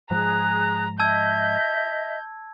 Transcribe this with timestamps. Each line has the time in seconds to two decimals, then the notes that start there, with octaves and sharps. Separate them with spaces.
0.11 G#2 F3 G#3 G#4 A#5 F#6
1.00 D#5 E5 A5 E6 G6 G#6